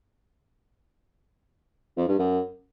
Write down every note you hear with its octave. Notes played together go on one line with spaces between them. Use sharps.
F2
G2
F#2